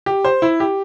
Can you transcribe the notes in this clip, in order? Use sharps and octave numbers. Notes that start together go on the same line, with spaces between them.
G4
C5
E4
G4